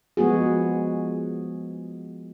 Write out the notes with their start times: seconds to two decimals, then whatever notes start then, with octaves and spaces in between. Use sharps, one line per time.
0.17 F3 G#3 B3 F#4 G#4